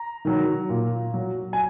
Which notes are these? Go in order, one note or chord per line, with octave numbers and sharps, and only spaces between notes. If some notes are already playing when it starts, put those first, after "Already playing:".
Already playing: A#5
D#3 F#3
A#2
F#3
G#5